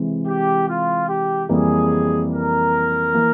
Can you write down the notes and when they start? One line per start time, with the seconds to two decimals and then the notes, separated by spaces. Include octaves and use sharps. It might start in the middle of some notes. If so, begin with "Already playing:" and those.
Already playing: C3 E3 G#3
0.26 G4
0.67 F4
1.08 G4
1.49 F2 E3 G3 A#3 G#4
2.32 A#4
3.14 E3 A#3